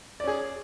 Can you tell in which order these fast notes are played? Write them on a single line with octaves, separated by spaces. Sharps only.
D5 C#4 G#4